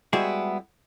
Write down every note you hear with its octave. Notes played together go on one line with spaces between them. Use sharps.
G3 G#3 B3 E4 F#4 G#4